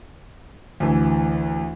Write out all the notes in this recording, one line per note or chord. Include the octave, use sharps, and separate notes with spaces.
D2 E3